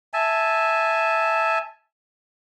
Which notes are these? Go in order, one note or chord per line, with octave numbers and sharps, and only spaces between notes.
E5 G#5 A5